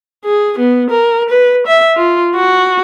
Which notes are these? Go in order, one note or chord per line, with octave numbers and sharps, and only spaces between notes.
G#4
B3
A#4
B4
E5
F4
F#4